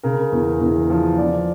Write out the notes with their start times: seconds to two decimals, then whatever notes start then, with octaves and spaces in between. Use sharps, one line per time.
0.03 C#3 A#4
0.32 E2
0.61 E2
0.90 F3
1.18 F3 D5